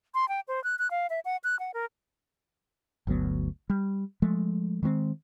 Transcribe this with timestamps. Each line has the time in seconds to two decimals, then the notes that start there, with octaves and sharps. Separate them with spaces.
0.14 C6
0.29 G5
0.48 C5
0.64 F#6
0.79 F#6
0.91 F5
1.10 E5
1.25 F#5
1.44 F#6
1.59 F#5
1.74 A#4
3.07 G1 D2 F#3 B3
3.70 G3
4.22 F3 G#3 A3
4.83 D#3 G#3 B3 C4